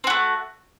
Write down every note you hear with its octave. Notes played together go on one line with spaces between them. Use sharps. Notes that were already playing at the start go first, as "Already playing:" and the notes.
A3 C4 F#4